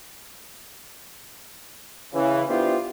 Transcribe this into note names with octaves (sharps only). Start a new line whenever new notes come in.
C#3 E3
B3 D4 E4 F4 G4 C5